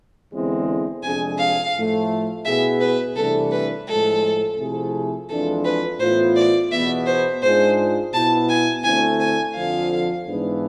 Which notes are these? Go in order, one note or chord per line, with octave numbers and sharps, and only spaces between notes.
E2 D3 G#3 C4 E4
F2 C3 G#3 D4 G#4 G#5
F5
A2 F3 A3
B2 B3 E4 G#4 E5
B4
C2 C3 E3 A3 D4 A4
B4
A2 F3 G#3 A4
C3 F3 A3 E4 G#4
F2 E3 G#3 D4 F4 A4
B4
A2 E3 B3 F4 C5
D5
E2 B2 B3 E5
C5
G#2 G#3 D4 F4 G#4 C5
B2 B3 E4 A5
G#5
D2 D3 A3 C4 E4 G#5
G#5
F2 D3 F3 F5
G#2 E3 B3 D4